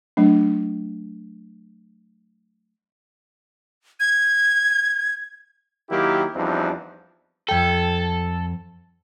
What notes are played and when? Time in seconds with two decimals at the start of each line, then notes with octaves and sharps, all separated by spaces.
0.17 F#3 A3 D4
4.00 G#6
5.91 D#3 F#3 A#3 E4 G4
6.35 E2 F3 G3 C4 D4 D#4
7.49 F2 A4 G5